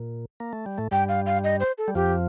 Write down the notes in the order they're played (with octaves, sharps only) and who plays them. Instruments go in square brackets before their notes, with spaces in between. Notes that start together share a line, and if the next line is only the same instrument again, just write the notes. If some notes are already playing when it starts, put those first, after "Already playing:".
Already playing: [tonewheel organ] A#2
A#3
A3
G3
A2 A3
[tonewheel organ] G2 G3 [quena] G5
[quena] F5
F5
D#5
C5
A4
[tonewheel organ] G3
[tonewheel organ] F2 F3 [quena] G4